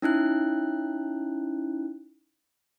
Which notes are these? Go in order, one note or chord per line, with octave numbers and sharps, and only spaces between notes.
C#4 D#4 E4 F#6